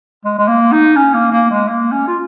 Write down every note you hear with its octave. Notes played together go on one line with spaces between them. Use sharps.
G#3
G#3
A#3
D#4
C#4
A#3
A#3
G#3
A#3
C#4
F4